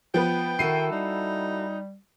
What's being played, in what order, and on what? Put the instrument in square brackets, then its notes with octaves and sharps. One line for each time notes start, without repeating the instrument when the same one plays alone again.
[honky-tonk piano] F3 B3 B4 [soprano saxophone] G5
[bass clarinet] D#3 [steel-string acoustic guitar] E4 F#4 A4 [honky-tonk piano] C7 D#7
[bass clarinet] G3 [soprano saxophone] D#4